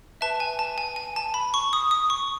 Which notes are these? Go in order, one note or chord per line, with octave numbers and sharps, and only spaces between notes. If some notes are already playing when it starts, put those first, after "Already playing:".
B4 E5 A5
G#5
A5
G#5
G#5
A5
B5
C#6
D#6
D#6
C#6